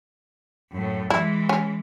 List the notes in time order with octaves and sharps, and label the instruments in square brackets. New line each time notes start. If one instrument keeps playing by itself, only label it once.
[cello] F#2 A2
[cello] E3 G#3 [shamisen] E4
[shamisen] C#4